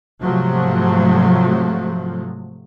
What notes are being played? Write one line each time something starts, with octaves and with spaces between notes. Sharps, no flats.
G#2 C3 F3 F#3 A3